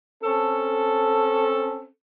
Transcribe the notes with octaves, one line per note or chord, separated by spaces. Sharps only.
C4 C#4 A4